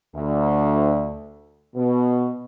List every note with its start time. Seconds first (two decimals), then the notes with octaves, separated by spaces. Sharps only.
0.15 D2
1.76 B2